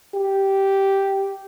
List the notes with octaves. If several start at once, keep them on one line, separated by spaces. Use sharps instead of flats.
G4